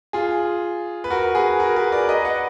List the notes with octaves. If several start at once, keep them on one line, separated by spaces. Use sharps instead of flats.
F4 G#4
B4
F#4 A#4
G#4 B4
F#4 A#4
G#4 B4
A#4 D5
B4 D#5
D#5 F#5